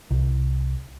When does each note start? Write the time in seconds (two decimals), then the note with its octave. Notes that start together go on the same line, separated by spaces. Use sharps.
0.11 C2